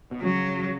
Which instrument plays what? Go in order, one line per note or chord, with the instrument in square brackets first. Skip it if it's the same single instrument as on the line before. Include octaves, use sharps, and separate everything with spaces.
[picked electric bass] B2
[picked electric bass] C#3 [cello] F#3